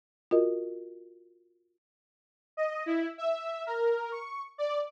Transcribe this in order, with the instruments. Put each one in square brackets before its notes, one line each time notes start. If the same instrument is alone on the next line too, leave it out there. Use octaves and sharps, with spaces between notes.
[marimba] F4 F#4 A#4 D#5
[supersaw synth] D#5
E4
E5
A#4
C#6
D5